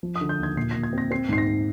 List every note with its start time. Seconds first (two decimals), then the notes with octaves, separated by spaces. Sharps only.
0.03 F3
0.16 D#6
0.21 D3
0.29 G6
0.39 D#2 G#6
0.56 A#2 C7
0.71 A#2 A#6
0.83 G#6
0.93 C4 A#6
1.11 C4 C7
1.29 G#2 C7
1.38 A#6
1.47 G#2